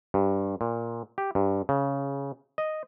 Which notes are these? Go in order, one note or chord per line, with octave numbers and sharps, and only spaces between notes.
G2
A#2
G4
G2
C#3
D#5